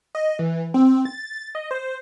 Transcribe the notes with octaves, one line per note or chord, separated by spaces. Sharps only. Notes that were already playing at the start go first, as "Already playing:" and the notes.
D#5
E3
C4
A6
D#5
C5